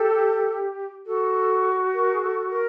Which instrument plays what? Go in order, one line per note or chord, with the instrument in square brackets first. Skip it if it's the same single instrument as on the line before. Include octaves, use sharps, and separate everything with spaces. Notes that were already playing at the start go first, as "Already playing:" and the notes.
Already playing: [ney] G4 [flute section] A4
[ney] F#4 [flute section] A4
[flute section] A#4
G#4
A4
A#4